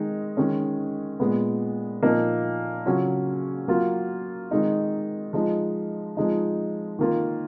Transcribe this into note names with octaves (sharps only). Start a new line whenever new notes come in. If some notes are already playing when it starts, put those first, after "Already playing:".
Already playing: D#3 G#3 D#4
D#3 G#3 C#4
A#2 G#3 B3
A#2 F3 A#3 D#4
C#3 F#3 C#4 F4
F#3 A#3 F4
D#3 G#3 D#4
F3 G#3 D#4
F3 G#3 D#4
D#3 A#3 F4